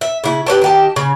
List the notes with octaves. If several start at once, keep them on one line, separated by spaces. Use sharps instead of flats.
E5
C#3 E4
G4 B4 C#5 A5
D#3 G4 A5
C#3